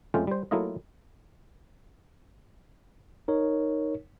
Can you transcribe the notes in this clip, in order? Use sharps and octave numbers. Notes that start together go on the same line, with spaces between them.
F2 G#3 A3 C#4 F4 G5
G3 C5
F#3 A3 A#3 E4 F4 D#5
D#4 A#4 C#5